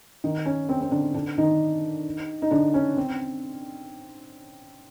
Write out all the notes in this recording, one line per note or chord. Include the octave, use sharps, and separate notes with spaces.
D#3 D#4
C#4
C4
C4
D3 D4
D3 D4
D#3 D#4
D#4
D3 D4
C#4
C4